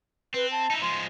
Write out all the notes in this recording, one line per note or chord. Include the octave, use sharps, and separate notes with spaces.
C4 B4
A5
D#4 E4
F3 G#3 C6